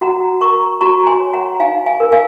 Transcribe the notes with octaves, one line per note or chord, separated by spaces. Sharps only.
F#4 F#5 A#5
A#4 A#5 C#6
F#4 A#5 C#6
G#5 C6
C#5
F#5 A#5
D#4 F5 G#5
F5 G#5
A#4
F5 G#5